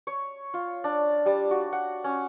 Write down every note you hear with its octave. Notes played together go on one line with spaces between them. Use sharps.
C#5
F4
D4
G3
F#4
F#5
C#4